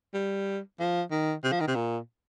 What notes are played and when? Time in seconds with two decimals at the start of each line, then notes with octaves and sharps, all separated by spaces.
0.14 G3
0.80 F3
1.11 D#3
1.44 C3
1.52 F3
1.60 D#3
1.67 C3
1.75 A#2